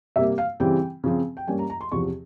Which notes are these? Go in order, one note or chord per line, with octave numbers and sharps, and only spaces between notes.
C3 G3 A#3 E5
F5
C#3 E3 G3 C4 G5
C#3 F3 C4
G5
G2 G3 A#3 C#4 G#5
A#5
A#5
C6
E2 C3 F3 C#6